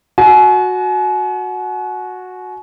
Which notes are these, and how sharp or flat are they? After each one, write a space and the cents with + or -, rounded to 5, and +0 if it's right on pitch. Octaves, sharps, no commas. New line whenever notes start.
F#4 -10 G#5 +40